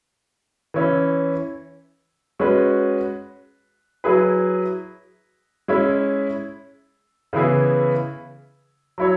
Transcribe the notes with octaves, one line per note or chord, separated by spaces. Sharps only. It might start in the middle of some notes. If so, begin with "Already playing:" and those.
E3 C#4 E4
G#3 C#4 F#4 B4
F#3 E4 G#4 B4
G#3 C#4 E4
C#3 E3 B3 E4 G#4
F#3 E4 C#5